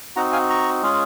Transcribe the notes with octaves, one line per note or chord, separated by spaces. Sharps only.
C4 D#4 F#4 F#5 A#5
F5 G#5
A#5 C#6
G#3 C#4 F4 G#4